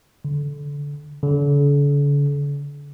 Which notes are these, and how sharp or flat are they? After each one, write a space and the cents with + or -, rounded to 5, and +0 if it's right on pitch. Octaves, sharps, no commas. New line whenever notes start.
D3 -25
D3 -45